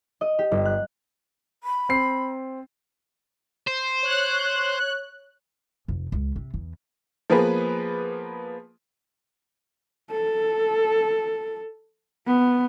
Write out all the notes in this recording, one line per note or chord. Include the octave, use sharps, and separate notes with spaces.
D#5
G4
G1
F#6
B5
C4 C7
C5
C#5 F#6
F1
C#2
C3
E2
F3 A#3 B3 G#4 B4
A4
B3